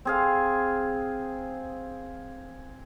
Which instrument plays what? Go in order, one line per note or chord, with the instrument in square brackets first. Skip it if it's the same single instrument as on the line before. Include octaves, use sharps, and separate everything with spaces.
[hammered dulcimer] C4 G#4 F5